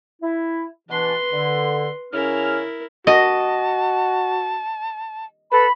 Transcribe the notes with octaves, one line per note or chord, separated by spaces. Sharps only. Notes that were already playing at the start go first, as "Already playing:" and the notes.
E4
B2 E3 D4 B4 C6
D3
C#3 C#4 E4 A#4 F6
F#4 D#5 A5
A4 B4 B5